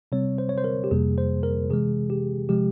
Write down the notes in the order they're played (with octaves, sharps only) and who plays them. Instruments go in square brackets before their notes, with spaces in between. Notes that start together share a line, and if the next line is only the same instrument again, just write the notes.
[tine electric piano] C3 G3 C4 C#5
C5
C#5
C5
A#4
G4
F2 C3 G3 A#3 G#4
C5
A#4
C3 E3 G#3 G#4
G4
C3 F3 G#3 G4